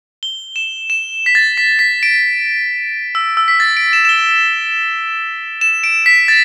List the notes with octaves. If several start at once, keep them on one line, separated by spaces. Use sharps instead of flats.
G7
E7
E7
B6
A6
B6
B6
D7
E6
E6
B6
A6
D7
E7
E7
G7
E7
D7
B6
A6